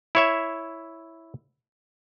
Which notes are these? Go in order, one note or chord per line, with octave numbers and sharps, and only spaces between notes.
E4 C#5 E5